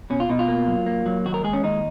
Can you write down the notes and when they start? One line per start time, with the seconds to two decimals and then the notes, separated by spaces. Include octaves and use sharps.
0.10 B2 C#4
0.20 F4
0.29 B2 D#4
0.39 F4
0.48 A#3
0.67 F#3
0.86 A#3
1.06 F#3
1.25 D#2 F#4
1.34 A#4
1.44 G#3 G#4
1.53 C#4
1.64 D#2 D#4